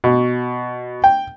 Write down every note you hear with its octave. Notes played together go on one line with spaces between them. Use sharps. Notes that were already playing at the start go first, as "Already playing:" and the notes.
B2
G5